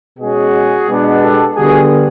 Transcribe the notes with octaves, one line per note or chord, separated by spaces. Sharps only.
B2 G#3 C#4 F#4 G#4
B2 G#3 B3 D4
G4 A4
D3 G3 B3 F#4 G#4